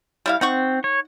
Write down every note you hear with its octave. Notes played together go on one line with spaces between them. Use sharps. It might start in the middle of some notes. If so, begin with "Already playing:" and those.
G3 E4 F5
C4 D#4 F#5 C#6
C#5